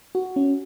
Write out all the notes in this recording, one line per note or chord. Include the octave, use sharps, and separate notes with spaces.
F#4
C#4